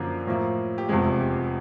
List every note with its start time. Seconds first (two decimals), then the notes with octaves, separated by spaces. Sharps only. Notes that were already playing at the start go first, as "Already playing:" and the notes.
Already playing: F#2 D3 F3 A#3 D4
0.27 A2 F3 A#3
0.78 G4
0.89 F1 E2 C3 F3 G#3 G#4
1.21 G4